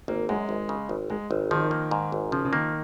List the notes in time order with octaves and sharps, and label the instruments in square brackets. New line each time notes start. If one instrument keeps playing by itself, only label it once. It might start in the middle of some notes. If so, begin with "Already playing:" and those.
[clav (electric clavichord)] G#1 [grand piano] A#3
[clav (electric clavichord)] F#2 [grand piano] G#3
[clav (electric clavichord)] G#1
C#3
G#1
[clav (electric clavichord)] G#2 [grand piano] G#3
[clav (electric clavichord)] G#1
[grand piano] D#3 [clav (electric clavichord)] F3
[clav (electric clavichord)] A#3
G#2
G#1
[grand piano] C#3 [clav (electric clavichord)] F3
[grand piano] C#3
[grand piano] D#3 [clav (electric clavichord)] A#3